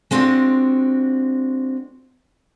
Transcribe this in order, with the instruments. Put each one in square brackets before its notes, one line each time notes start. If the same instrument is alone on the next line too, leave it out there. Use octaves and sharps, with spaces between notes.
[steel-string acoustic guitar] G#3 B3 C4 D4 F4 F#4